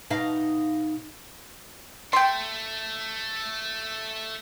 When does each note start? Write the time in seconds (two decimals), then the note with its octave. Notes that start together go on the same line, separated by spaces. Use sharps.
0.10 B2 D#4 F5
2.13 A3 G5 C6